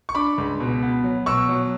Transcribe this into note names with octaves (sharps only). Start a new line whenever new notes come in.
C#6
D4 B5 D6
C#2
B2
B3
F#3
B2 C#6 E6
F#3